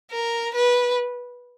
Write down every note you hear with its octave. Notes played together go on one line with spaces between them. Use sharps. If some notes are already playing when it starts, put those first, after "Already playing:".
A#4
B4